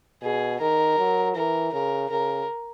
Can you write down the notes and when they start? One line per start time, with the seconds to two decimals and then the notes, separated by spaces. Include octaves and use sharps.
0.22 B2 G#4
0.60 D#3 A#4
0.98 F#3
1.35 E3 A#4
1.73 C#3 A#4
2.10 C#3 A#4